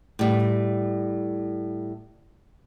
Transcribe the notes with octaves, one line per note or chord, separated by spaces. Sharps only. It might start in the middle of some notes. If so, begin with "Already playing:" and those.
A2 G3